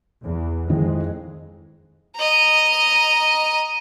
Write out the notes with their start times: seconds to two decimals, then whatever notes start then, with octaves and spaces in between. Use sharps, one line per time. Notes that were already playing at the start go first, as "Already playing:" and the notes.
0.25 E2
0.69 F2 D#3 G#3 E4
2.17 D#5 A#5